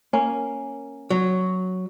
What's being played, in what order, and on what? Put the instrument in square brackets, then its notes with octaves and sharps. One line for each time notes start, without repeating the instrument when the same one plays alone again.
[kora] A#3 C#4
[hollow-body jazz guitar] F#3